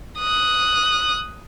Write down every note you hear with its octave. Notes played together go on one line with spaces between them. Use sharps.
D#6 F#6